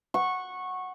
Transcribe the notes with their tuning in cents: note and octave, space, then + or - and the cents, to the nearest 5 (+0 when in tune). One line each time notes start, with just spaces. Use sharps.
F#5 +0 C#6 -15